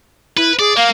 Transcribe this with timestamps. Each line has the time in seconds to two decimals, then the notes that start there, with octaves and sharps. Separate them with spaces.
0.37 E4 B4
0.59 G#4 D5
0.77 A#3 F5